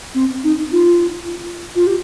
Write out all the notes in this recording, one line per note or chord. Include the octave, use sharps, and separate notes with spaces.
C4
D#4
F4
F4
G4